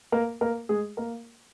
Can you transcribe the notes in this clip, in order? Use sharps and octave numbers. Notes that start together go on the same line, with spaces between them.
A#3 A#4
A#3 A#4
G#3 G#4
A#3 A#4